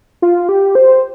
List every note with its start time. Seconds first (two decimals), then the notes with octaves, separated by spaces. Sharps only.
0.22 F4
0.49 G4
0.75 C5